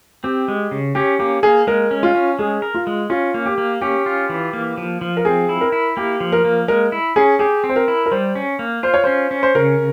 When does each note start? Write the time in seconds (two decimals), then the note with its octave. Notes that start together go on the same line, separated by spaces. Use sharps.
0.24 C4 G4
0.48 G#3
0.71 C#3
0.95 C#4 G4
1.19 A#3 G4
1.43 A#3 G#4
1.67 G#3 A#4
1.91 C#4
2.03 F4
2.15 C#4
2.39 G#3 G#4
2.62 A#4
2.75 F4
2.87 G#3
3.10 C#4 F4
3.34 A#3
3.46 G4
3.58 A#3
3.81 C#4 G4
4.06 F4
4.29 E3
4.53 A#3
4.77 F3
5.01 F3
5.17 A#4
5.25 C4 G#4
5.49 E4
5.61 A#4
5.72 E4
5.97 A#3 G4
6.20 F3
6.32 A#4
6.45 A#3
6.68 G#3 A#4
6.92 E4
7.16 C#4 G#4
7.39 G4 G#4
7.64 C4
7.69 C5
7.76 A#4
7.88 E4
8.06 A#4
8.11 G3 C5
8.35 C#4
8.59 A#3
8.83 F4 C5
8.94 C#5
9.04 C#4 C5
9.31 C#4
9.43 C5
9.55 C#3 A#4